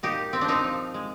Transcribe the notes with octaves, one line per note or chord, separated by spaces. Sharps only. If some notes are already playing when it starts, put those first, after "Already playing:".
A#2 D#4 G4
A#2 C4
D4
C4 D#4
F3
G#3